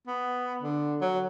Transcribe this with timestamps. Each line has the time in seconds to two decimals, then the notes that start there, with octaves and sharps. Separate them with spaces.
0.07 B3
0.62 D3
1.01 F#3